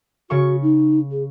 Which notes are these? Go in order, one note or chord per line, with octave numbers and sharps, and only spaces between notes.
C#3 F#4 C#6
D#4
G#4